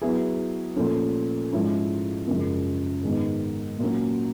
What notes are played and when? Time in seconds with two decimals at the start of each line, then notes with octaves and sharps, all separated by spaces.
0.02 F#3 B3 E4 G#4
0.76 A#2 F3 A3 C#4
1.53 G#2 F3 G#3 C#4 E4
2.27 F#2 C#3 F3 G#3
3.03 G#2 D#3 G#3 B3
3.79 A#2 F#3 A#3 C#4